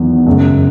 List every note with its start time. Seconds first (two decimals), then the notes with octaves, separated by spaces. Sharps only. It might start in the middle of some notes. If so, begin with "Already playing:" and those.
Already playing: E2 D#3 F#3
0.27 F#2 C#3 G#3